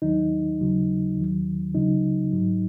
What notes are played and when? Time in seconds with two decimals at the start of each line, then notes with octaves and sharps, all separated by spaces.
0.02 D#2 D#3 F#3 D#4
0.60 D#2 C#3 F#3
1.17 D#2 D#3 F#3
1.75 C#2 C#3 F#3 D#4
2.32 G#2 F#3